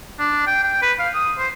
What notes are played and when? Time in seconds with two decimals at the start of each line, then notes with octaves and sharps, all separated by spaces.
0.19 D4
0.47 G5
0.64 G5
0.82 B4
1.00 F5
1.14 D#6
1.38 C5